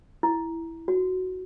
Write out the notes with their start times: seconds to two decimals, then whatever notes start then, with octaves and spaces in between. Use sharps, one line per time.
0.23 E4
0.88 F#4